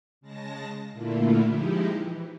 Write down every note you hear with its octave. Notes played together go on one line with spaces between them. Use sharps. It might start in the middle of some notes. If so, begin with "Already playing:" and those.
C#3 G#3 A5 A#6
A#2 D3 A3 A#3 E4 F4
F3 G#3 D#4 E4 G4
E3